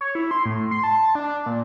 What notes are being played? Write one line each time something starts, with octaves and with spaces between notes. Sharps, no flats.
C#5
E4
C6
A2
C6
A5
D4
A#2